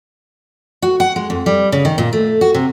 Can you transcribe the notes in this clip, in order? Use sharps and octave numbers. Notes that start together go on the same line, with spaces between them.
F#4
F#5
G#3
F2
G3
C#3
D#3
A#2
A3
F#4
C3